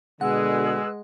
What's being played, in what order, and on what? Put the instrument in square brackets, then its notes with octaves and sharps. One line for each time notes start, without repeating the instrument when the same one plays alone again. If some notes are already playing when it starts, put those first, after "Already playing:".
[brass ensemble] B2 D3 [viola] G#3 [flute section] G#4 B4 E6 [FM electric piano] F#5